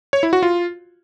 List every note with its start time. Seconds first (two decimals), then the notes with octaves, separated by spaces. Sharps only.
0.13 C#5
0.23 E4
0.33 F#4
0.43 F4